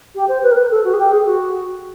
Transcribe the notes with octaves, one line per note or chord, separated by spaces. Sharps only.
G4
C5
B4
A#4
B4
A4
F#4
G#4
G4
G#4
F#4